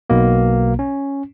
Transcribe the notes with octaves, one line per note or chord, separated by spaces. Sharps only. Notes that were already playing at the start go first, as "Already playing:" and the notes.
B1 B2 A#3
C#4